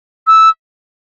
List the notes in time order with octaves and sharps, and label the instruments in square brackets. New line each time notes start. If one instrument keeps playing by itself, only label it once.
[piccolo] E6